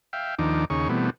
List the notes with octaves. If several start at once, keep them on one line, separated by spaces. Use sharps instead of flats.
E5 F5 G5
D#2 D#3 F3 D4 D#4 D6
D#2 C#3 D#4 G#4 C#5 C#6
B2 E3 G3 A3 B3 C4